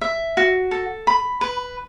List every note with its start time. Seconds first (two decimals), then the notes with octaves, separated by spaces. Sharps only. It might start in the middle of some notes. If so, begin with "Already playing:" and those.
0.01 E5
0.37 F#4
0.71 A4
1.07 B5
1.41 B4